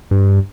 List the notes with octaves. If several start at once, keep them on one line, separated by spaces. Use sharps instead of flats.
G2